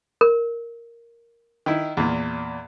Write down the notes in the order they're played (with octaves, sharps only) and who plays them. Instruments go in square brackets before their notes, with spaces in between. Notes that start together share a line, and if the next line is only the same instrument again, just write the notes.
[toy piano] A#4
[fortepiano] D#3 E4
E2 A#2